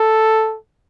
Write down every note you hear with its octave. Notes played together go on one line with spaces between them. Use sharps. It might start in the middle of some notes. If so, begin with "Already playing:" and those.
Already playing: A4